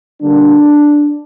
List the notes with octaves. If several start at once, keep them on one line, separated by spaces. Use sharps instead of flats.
D3 G3 A#3 D4